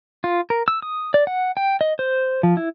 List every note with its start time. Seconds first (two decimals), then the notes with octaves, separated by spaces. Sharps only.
0.24 F4
0.50 A#4
0.68 E6
0.82 D#6
1.14 D5
1.27 F#5
1.57 G5
1.81 D#5
1.99 C5
2.43 F3
2.57 E4